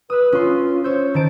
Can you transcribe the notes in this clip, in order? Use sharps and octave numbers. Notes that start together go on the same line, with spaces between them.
B4 D#6 E6
C#4 F4 C6
C5 C#5 E6 G6
D#3 C5 A5 D7